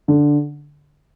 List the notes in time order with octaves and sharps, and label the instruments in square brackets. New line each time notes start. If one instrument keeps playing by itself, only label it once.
[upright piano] D3